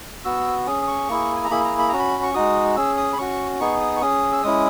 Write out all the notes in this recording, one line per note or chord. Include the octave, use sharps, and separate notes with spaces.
B3 F#4 E6
C#4 G#4 D#6
D#6
C#6
A#3 E4 G#4
G#5
A#5
A#3 E4 G#4 B5
A#5
B5
C#4 F#4 A#5
B5
C#6
G#3 D#4 F#4 D#6
C#4 G#4 E6
D#6
B5
C#4 F#4 C#6
B3 D#4 G#4 C#6
D#6
C#6
C#4 G#4 D#6
E6
G#3 C#4 E4 D#6